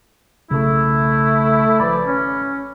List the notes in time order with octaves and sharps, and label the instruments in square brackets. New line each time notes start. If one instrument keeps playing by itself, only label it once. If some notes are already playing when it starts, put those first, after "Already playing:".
[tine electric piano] B1 C#3 [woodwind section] A3 E4
[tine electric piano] G#1 B5 [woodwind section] E3 F3 D5
[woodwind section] C#4